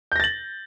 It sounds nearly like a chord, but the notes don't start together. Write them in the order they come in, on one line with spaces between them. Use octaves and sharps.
G6 A#6 A6 F#7